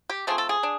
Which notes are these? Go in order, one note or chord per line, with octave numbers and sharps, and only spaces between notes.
G4
F3 A3 C4 G#4
A4
G#4
D4